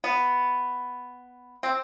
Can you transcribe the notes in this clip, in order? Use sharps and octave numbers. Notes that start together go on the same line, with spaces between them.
B3
C4